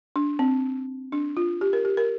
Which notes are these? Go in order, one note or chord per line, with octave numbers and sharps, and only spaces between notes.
D4
C4
D4
F4
G4
A#4
G4
A#4